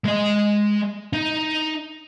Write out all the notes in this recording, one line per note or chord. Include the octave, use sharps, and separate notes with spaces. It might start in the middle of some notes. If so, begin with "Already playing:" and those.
G#3 D#5
D#4